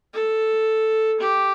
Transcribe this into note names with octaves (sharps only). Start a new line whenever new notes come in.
A4
G4